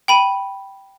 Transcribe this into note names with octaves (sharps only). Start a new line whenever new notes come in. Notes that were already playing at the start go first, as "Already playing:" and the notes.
G5 B5 D#7